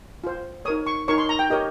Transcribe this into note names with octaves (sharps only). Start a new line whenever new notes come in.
F4 C5
D#4 A#4 C#5 D#6
C#6
D#4 A#4 C#5 C#6
C6
A#5
G5
G4 A#4 C#5 D#5